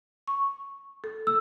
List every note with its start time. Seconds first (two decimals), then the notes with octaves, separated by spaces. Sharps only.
0.27 C#6
1.04 A4
1.27 E6